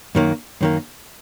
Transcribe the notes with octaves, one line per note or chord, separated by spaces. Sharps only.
F#2 D#3 A#3
F#2 D#3 A#3